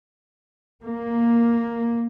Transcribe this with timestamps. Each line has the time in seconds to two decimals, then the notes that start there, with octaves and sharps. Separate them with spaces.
0.83 A#3